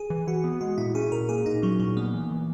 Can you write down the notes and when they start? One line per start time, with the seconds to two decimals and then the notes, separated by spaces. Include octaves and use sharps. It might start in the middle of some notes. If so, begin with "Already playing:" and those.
Already playing: G#4
0.10 E3
0.27 E3 F#4
0.44 B3
0.61 G#3 F#4
0.78 A#2 E4
0.95 C#4 G#4
1.12 A#2 A#4
1.29 A#3 G#4
1.46 A#2 D#4
1.62 F#3 C#4
1.80 A#2 F#3
1.97 A#3 B3
2.14 E3
2.31 E3